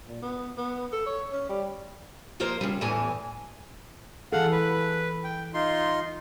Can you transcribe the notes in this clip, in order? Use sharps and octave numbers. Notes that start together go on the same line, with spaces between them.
A#2
B3
B3
A4
C#5
C#4
G3
F3 A#3 F4 A#4 C5 D#5
C#3 G3
E2 A2 E3 G#5
E3 G#4 A4 F5 F#5
B4
G5
D#4 F4 C6